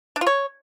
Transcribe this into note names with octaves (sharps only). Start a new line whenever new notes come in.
D4
F4
C#5